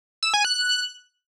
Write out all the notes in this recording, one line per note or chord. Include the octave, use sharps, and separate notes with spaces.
E6
G#5
F#6